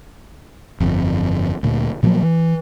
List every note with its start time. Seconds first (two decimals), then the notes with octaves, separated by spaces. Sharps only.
0.80 G1 F2
1.63 D2 A#2
2.03 A#2 F3 F#3 A#3
2.23 E3